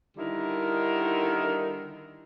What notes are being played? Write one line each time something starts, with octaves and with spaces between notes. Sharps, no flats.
D3 D#3 G3 D#4 E4 A#4